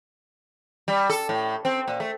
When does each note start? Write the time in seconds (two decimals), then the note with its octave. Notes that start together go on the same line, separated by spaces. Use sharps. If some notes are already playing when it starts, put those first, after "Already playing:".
0.88 G3
1.10 A4
1.29 A2
1.65 C4
1.88 A#2
2.00 A3